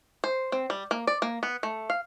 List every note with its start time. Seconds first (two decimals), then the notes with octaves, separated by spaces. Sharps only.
0.24 C5
0.52 C4
0.70 G3
0.91 A#3
1.07 D5
1.22 A#3
1.43 B3
1.63 A3
1.90 F5